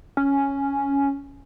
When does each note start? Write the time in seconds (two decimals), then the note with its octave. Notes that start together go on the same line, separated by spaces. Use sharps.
0.17 C#4